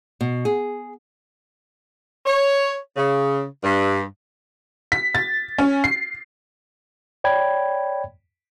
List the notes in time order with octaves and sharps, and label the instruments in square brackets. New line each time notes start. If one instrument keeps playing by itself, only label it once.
[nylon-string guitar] B2
G#4
[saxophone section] C#5
C#3
G2
[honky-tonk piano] B6
A6
C#4
C7
[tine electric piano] C#5 D5 G5 B5 G#6